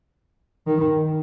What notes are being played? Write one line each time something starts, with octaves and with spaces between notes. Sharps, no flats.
D#3